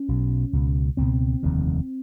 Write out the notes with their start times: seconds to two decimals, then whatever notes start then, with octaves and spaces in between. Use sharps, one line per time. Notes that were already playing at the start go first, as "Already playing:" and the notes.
Already playing: C#4
0.09 B1 B2
0.53 C#2 B2
0.97 C#2 B2 C4
1.43 F1 D#2 D3